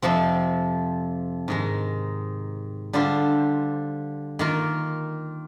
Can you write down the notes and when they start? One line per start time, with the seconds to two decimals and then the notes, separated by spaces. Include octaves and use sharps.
0.02 F2 C3 F3 C4
1.48 G#2 D#3 G#3
2.93 D3 G3 D4 F4 C5
4.39 D#3 A#3 F4